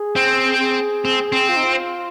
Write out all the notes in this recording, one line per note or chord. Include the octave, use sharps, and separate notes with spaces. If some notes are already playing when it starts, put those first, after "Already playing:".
Already playing: G#4
C4
G#4
C4
C4
F4
D#4
F4